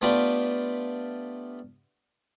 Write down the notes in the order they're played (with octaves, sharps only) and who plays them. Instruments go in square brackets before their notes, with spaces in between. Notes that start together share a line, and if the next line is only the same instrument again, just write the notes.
[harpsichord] A3 B3 D4 F4 G4 B4